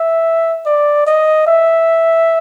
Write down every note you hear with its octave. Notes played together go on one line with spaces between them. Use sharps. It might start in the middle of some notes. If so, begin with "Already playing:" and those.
Already playing: E5
D5
D#5
E5